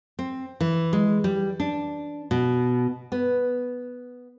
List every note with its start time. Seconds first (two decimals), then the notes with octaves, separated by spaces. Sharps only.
0.19 C4
0.61 E3
0.93 G#3
1.24 G3
1.60 D4
2.31 B2
3.12 B3